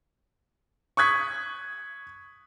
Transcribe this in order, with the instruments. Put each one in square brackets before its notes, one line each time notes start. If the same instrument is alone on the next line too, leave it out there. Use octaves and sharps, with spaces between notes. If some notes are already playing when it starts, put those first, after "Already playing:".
[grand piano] C#6 D#6 F#6 G#6 B6